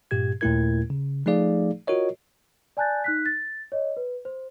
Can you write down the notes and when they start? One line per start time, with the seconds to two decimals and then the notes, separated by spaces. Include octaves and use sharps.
0.11 G2 A#2 G4 G#6
0.41 D#2 A#2 A3 E4 A#4 G#6
0.90 C#3
1.26 F3 A3 D#4 G#4 D5 F5
1.87 F4 F#4 A#4 C#5 D#5
2.77 D5 G#5 A5 F#6 G6 A6
3.04 D#4 F#6 B6
3.26 A6
3.72 C#5 D#5
3.97 B4
4.25 C5